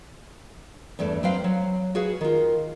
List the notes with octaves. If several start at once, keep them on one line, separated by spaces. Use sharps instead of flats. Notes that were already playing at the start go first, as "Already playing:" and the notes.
E2 G2 A3 D4
F#3 C4 B4 F5
F#3
F#4 G#4 B4 F5
D#3 F4